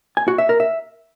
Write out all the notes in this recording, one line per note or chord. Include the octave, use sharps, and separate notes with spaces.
G#5
F#4
E5
A#4
E5